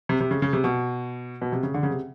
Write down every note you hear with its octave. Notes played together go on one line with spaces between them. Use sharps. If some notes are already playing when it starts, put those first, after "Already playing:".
C3
C3
C#3
C#3
C3
B2
B2
C3
C#3
D3
C#3
C3